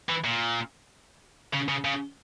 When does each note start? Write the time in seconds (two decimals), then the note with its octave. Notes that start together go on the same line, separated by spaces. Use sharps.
0.09 E3
0.24 A#2
1.53 C#3
1.68 C#3
1.85 C#3